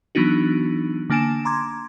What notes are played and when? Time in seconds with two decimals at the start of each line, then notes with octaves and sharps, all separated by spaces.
0.15 E3 F#3 B3 D4 D#4 F#4
1.10 D3 A#3 D4 G#5 D7 E7
1.45 A#5 C6 D6 G#6